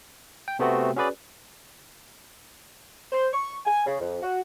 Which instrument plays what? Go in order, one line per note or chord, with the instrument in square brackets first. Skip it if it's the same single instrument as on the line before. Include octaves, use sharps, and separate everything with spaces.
[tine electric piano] G5
C3 A3 B3 C4 F#4
C#4 F#4 G#4 B4 D5
[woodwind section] C5
C#6
G#5
C#3
F2
F#4